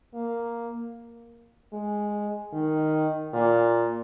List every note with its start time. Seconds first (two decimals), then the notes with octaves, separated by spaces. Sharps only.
0.14 A#3
1.73 G#3
2.53 D#3
3.33 A#2